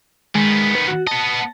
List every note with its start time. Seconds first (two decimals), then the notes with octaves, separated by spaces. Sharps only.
0.35 D#3 G#3 B3
0.75 B4
0.88 F#4
1.07 B3 D#5 A5